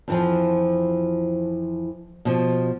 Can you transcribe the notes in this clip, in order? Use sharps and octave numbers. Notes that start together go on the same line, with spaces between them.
F2 E3 F3
B2 F3